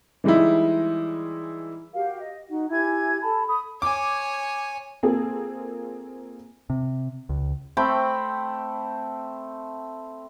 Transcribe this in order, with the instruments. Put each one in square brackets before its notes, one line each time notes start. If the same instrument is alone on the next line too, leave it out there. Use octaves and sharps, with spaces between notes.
[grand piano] E3 G3 G#3 D#4 E4
[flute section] F#4 G4 A#4 F5
D#5
D#4 F#4
E4 G4 G#5 G#6
A4 A5 B5
B5 D#6
[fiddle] C#5 G#5 [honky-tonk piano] D6
[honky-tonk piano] A#3 C4 F4 G#4 A4
[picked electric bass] C3
C#2
[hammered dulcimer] A3 C4 G5 B5